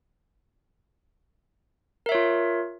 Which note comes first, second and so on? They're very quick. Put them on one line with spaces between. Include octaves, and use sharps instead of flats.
A#4 E5 C#5 F4